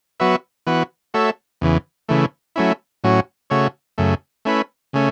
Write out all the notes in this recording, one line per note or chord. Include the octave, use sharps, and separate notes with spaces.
F#3 B3 F#4 B4 E5
E3 B3 F#4 B4
A3 F#4 A4 C#5 E5
E2 C#3 E3
C#3 E3 A3
F#3 A3 C#4 E4
A2 F#3 C#4 F#4
C#3 A3 F#4 C#5
F#2 C#3 A3
A3 C#4 E4 B4
C#3 A3 C#4